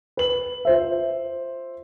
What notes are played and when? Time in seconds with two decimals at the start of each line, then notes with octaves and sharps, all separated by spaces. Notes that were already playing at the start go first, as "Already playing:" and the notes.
0.17 B4 F#7
0.65 F4 C5 E5